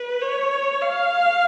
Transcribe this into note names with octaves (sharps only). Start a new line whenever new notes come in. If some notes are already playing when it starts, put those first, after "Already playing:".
Already playing: B4
C#5
F5